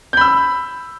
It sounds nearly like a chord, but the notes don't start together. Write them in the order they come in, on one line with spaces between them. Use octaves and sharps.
G6 B5 E6